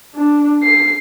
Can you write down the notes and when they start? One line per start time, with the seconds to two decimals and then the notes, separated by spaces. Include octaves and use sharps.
0.15 D4
0.63 C7